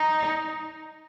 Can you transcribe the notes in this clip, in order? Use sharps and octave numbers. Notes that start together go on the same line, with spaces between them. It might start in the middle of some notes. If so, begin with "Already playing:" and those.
Already playing: D#4